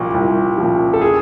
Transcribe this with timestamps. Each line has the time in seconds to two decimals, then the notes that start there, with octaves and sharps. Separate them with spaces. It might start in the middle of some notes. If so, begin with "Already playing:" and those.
Already playing: C2 A#2 F3
0.14 C2
0.58 F3
0.63 A#2
0.94 A4
1.02 G#4